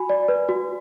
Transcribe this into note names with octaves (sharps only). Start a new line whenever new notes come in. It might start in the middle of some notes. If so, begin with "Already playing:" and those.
Already playing: F#4 G#5 B5
D5
B4
F#4